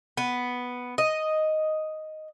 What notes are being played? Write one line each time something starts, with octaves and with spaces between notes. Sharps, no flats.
B3
D#5